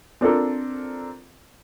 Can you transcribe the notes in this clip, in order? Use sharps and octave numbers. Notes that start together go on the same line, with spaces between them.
C4 D4 F4 A4 A#4